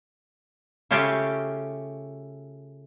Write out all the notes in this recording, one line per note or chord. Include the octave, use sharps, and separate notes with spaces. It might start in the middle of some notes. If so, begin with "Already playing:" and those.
C#3 A3 C#4 F4 G4